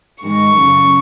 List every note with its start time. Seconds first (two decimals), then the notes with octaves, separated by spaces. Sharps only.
0.22 G#2 D#3 G#3 C#6
0.55 F#2 C#3 F#3